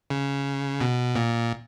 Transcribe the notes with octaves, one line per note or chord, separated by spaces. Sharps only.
C#3
B2
A#2